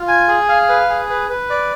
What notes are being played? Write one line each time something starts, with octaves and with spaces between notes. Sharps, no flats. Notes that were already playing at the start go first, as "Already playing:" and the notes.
Already playing: F4
G#5
G#4
F5
B4
G#4
B4
B4
D5